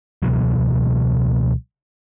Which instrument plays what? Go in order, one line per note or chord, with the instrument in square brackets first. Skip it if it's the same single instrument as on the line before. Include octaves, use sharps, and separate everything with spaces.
[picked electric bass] C#2 B2 E3 F#3